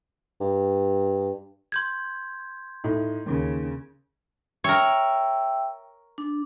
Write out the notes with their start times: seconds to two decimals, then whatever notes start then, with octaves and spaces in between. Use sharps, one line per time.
0.41 G2
1.72 C6 G6 G#6
2.84 A2 D#4
3.26 D#2 C#3
4.64 A#4 C#5 E5 G5 E6
6.18 D4